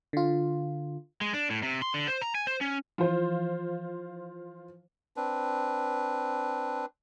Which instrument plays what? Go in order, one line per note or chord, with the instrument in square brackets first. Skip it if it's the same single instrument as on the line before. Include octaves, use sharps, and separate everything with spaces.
[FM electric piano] D3 F4
[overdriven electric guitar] G#3
D4
A2
C3
C6
D3
C5
A#5
G#5
C5
C#4
[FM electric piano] E3 F3 [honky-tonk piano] F4 C5
[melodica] C4 D4 B4